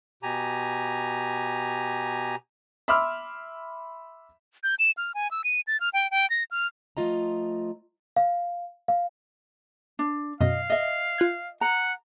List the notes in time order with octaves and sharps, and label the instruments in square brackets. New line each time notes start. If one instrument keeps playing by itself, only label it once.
[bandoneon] B2 G4 G#5 A#5
[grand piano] E5 B5 C6 D6 E6 F6
[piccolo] G6
E7
F6
G#5
E6
D#7
A6
F6
G5
G5
A#6
F6
[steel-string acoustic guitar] F3 A3 F4 D#5 A#5
[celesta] F5
F5
[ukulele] D4
[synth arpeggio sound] F#2 B2 [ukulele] D#5 [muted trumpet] F5
[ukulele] D#5 E5
[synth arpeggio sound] F4 F#6 G#6
[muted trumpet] F#5 [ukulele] A#5